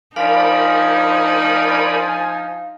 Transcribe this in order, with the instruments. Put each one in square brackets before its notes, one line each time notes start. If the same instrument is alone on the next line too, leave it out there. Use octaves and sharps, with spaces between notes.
[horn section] F3 G#5 [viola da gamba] D#4 [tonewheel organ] A#4 D5 B5 [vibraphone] F5